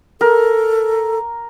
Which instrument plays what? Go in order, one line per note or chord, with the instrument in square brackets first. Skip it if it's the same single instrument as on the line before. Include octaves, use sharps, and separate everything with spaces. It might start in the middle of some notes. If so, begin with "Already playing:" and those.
[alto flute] A4 [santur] A#4